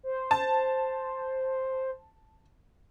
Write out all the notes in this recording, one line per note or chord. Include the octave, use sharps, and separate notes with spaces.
C5
A5